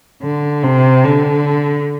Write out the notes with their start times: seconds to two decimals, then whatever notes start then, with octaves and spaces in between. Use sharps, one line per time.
0.23 D3
0.63 C3
1.04 D3